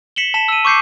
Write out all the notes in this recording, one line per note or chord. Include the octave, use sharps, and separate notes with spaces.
B6 C#7 E7 F#7 G7
A5 B6 E7
E6 D#7
C#6 D6 G6 C7 C#7